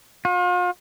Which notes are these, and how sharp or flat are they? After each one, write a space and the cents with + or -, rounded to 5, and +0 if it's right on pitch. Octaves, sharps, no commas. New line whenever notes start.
F4 +40